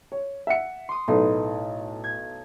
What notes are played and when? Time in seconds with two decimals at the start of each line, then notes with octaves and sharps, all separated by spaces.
0.12 C#5
0.47 E5 F#5 C#7
0.89 C6 D#6
1.08 B1 A2 D#4 B4
2.04 G#6